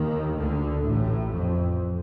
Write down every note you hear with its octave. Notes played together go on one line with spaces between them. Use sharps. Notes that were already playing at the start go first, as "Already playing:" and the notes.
Already playing: D#2 D#3
D2 D3
A1 A2
F2